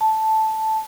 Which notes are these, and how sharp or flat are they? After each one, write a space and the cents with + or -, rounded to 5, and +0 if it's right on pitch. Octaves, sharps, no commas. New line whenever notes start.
A5 -5